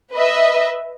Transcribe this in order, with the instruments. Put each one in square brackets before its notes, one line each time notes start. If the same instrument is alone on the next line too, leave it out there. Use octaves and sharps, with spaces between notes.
[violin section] B4 D#5 E5